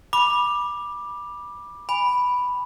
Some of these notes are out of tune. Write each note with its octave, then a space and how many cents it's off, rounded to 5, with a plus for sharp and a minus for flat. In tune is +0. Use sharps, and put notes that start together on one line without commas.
B5 -20 D6 +10
G#5 -25 B5 +0